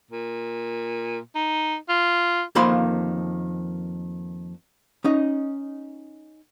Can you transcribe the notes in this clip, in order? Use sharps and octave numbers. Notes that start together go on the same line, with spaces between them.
A#2
D#4
F4
F2 D#3 A#3 C5 B5 C6
C#4 D#4 D#5